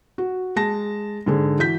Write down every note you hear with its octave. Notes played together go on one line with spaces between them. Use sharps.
F#4
G#3 A5 A#6
G#2 D3 G#4
E3 F#4 G6 B6